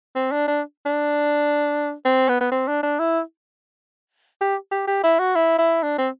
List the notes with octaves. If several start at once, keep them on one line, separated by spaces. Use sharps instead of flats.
C4
D4
D4
D4
C4
B3
B3
C4
D4
D4
E4
G4
G4
G4
E4
F#4
E4
E4
D4
C4